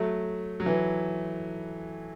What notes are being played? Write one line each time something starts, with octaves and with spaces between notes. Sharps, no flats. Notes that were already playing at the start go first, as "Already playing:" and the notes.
Already playing: F#3 A3
F#3
E3